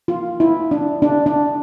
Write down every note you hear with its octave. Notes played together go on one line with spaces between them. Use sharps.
F4
E4
D4
D4
D4